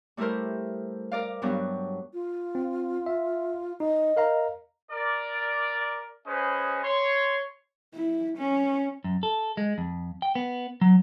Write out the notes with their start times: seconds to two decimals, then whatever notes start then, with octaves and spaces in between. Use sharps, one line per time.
0.17 G3 A3 E4 A4 A#4 C5
1.12 A#4 D5 F5
1.42 G2 F#3 G3 B3 D4
2.14 F4
2.55 C4
3.06 E5
3.80 D#4 D#5
4.17 A#4 F5 A#5
4.91 A#4 D5
6.27 C#4 G#4 B4 C5 D#5
6.84 C#5 C6
7.94 E4
8.38 C#4
9.04 F#2
9.23 A4
9.57 G#3
9.78 F2
10.22 G5
10.35 B3
10.81 F#3